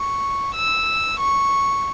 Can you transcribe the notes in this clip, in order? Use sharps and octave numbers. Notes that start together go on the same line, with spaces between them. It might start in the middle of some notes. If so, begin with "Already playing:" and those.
Already playing: C#6
E6
C#6